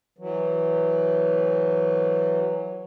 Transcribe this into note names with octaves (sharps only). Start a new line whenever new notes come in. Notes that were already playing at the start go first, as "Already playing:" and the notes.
E3 F#3